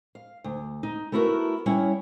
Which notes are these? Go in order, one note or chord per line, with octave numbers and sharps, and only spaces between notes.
F5
D2
D#4
A3 B3 E4 F#4 G4 A#4
G3 C#4 E4 C#5 E5 F#5